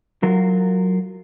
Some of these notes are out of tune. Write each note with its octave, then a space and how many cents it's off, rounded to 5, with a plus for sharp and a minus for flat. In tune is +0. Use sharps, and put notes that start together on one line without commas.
F#3 +0 F4 -5 A#4 -25